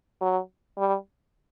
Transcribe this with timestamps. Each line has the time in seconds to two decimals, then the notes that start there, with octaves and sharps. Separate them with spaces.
0.21 F#3
0.78 G3